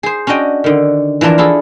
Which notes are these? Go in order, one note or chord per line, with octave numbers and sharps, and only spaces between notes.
G#4 C5
C#4 D4 F#4 D#5 G5
D3 D#3
E3 F3 D4 F4 A#4
E4 F4 G#4 A4